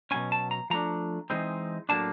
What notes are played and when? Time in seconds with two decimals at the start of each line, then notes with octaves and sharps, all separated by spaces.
0.11 B2 F#3 A3 C#4 G#5
0.32 A5
0.51 A#5
0.70 F3 A3 D4 A#5
1.30 E3 G#3 C4 D#4
1.89 A2 F#3 A#3 D4 A5